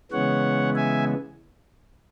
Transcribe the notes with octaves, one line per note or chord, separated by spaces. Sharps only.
C#3 E3 G#3 B3 C#5 F#5
E5 G#5